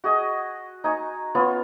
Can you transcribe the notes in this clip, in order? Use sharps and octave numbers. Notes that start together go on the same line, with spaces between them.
F#4 G#4 D#5
D#4 G#5 C#6
B3 C#4 F4 F5